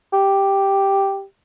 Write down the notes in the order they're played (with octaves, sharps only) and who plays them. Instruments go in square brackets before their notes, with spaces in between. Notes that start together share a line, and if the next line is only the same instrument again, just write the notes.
[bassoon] G4